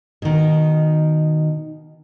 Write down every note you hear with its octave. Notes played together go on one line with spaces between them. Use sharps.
B2 D#3